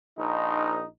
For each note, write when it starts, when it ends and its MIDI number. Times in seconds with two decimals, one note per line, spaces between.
0.19 0.84 34
0.19 0.84 63